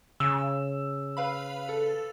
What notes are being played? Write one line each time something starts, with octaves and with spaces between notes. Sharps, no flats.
C#3 E6
B4 F5 B5
A4